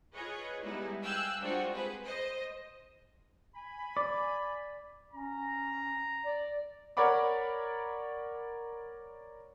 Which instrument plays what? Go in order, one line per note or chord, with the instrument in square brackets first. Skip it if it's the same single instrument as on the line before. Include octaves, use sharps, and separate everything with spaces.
[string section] F4 G#4 B4 C#5 D#5
G3 G#3 B3 D#4 E4
F5 G5 G#5 E6 F#6
G3 G#3 C4 D4 F4 F#4
G#4 B4 C5
C5 D#5
[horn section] G#5 B5
[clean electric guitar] D5
[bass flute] C#4 [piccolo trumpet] A#5
[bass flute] D5
[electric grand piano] A#4 C#5 D5 F#5 B5 D6